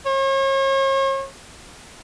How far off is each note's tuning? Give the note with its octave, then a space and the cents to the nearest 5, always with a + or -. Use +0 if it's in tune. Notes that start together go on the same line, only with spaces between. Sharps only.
C#5 -40